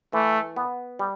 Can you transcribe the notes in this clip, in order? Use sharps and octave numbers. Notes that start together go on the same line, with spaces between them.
E3 A3
B3
G3